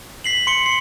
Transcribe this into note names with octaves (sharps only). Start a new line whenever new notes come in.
B6 C7 F#7
C6 C#7 G7
C7